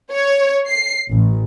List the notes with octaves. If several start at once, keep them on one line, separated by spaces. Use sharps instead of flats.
C#5
C7
A1